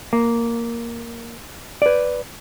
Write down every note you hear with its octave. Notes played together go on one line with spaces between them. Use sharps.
A#3
B4 D5